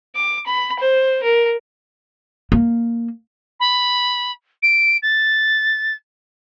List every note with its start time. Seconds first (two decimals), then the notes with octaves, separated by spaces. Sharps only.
0.15 D6
0.46 B5
0.79 C5
1.23 A#4
2.52 A#3
3.60 B5
4.63 D7
5.02 A6